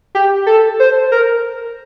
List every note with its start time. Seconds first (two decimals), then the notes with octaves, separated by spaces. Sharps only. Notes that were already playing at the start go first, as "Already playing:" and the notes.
0.15 G4
0.46 A4
0.80 C5
1.12 A#4